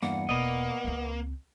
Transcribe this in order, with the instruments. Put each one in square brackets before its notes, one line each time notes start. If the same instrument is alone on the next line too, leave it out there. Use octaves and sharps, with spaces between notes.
[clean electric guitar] E2 G2 A#3 [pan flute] F#5
[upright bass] E1 [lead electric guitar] A#3 [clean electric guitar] B3 D5 D#5
[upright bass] C#2 C4